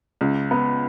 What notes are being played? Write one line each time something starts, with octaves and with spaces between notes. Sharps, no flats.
C#2
B3